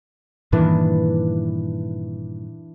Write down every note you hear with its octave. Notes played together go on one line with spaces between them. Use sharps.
G2 A#2 D#3 E3 D4 B4